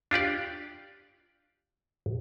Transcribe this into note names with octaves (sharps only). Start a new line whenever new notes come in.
D4 F4 G4 D5